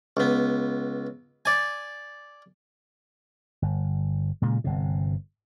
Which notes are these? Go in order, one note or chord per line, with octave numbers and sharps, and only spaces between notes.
C#2 B3
D5 G#5
G1
A#2 C#3 G#3
G1 C3